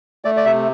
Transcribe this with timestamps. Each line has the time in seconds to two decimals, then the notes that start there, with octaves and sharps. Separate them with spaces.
0.25 A3 D5
0.37 D5
0.45 C3 E5